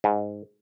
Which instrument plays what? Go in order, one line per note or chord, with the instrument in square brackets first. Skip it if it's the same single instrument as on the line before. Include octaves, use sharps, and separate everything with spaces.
[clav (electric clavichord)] G#2